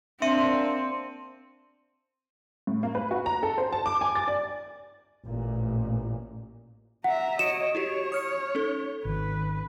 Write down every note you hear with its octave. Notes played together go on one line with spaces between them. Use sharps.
A#3 C4 D4 E5 C6 C#7 D#7
A2
A#3
B4
F#4
A#5
A4
C5
A5
D6
G#5
A6
D5
A1 A#2
E5 F#5 A#5
F#4 C#5 D#5 C#7 D7 E7
E4 F#4 G4 C#5
D#6 F6 C#7
C#4 D#4 A4
G#1 D#3 B4